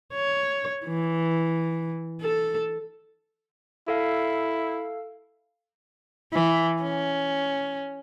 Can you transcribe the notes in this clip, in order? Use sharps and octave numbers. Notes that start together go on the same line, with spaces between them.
C#5
E3
A4
E4 A4 F5
E3
C#4